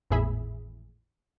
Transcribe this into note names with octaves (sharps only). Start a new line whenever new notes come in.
G#1 E2 A2 G#4 E5 B5